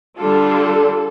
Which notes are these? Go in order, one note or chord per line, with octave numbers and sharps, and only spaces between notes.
D3 G3 D4 F4 A4